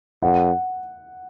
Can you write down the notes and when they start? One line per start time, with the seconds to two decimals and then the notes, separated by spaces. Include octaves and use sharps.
0.22 F2 F#5